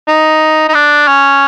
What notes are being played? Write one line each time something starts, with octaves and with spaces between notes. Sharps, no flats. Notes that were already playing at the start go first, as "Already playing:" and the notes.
D#4
D#4
D4
C#4